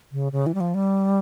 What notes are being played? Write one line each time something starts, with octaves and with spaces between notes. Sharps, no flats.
C#3
C#3
E3
G3
F3
G3